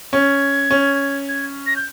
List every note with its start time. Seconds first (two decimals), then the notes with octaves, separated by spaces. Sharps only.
0.13 C#4 G#6
0.71 C#4
1.29 G#6
1.66 A#6
1.76 G6